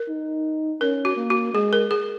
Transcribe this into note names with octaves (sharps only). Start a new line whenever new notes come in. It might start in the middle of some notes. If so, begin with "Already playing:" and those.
Already playing: A#4
D#4
C#4 A#4
F#4
A#3
F#4
G#3 G#4
A#4
G#4